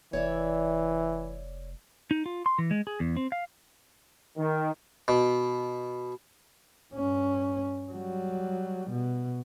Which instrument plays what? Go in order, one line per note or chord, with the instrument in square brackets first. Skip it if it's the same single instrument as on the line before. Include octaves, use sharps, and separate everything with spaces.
[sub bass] F1 [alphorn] E3 [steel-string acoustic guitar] C#5 D5 E5
[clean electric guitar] D#4
F4
C6
E3
G#3
G#4
E2
C4
F5
[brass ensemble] D#3
[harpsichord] B2
[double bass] G2 C#4
F#3 G3
B2